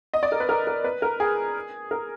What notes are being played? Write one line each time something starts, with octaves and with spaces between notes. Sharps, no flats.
D#5
D5
A#4
B4
A#4
A#4
B4
A#4
G#4
A#4